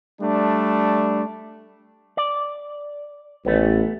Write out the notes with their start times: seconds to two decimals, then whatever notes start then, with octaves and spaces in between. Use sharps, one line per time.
0.21 G3 A3 D4
2.17 D5
3.46 A1 A3 B3